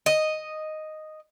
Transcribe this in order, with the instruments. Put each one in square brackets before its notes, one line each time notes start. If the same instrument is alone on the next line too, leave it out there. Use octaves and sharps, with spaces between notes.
[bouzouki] D#5